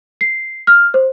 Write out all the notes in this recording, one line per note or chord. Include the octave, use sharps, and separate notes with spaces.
C7
F6
C5